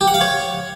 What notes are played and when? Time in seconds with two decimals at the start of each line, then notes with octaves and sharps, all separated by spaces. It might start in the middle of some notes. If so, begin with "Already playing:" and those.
0.01 G4
0.08 F#5
0.14 F5
0.21 C#5